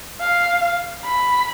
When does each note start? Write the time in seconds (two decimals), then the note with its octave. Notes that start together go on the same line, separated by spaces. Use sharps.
0.21 F5
1.05 B5